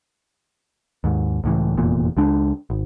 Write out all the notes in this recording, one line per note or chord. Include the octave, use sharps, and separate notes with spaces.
D#2 G#2
C#2 A2 E3
F1 E2 A#2
C#2 G#3 D4
G#1